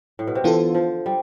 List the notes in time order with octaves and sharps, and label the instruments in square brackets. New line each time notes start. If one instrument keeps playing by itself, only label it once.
[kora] A2
B2
C3
[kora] D3 [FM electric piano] E3 B3 F4 A4
[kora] F3
G3